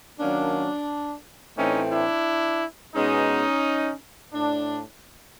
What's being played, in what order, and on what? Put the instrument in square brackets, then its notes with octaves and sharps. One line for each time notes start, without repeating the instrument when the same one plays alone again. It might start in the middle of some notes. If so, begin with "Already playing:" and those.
[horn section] D#3 F#3 A#3 C#4 D4
A2 E3 A3 C4 C#4 D#4
D4 E4
B2 G#3 B3 C#4 D#4
A2 D4